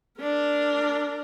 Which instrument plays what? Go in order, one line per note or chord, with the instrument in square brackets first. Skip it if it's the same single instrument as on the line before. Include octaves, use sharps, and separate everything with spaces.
[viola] D4 A#4